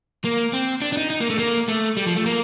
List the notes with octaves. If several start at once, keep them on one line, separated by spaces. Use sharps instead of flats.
A#3
C4
D4
D4
D#4
D#4
A#3
A3
A#3
A3
G3
F3
A3
A#3